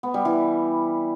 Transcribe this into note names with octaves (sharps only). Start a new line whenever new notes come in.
B3
G3
E3